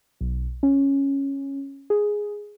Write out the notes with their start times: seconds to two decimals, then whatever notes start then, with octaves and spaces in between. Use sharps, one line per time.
0.21 B1
0.63 C#4
1.90 G#4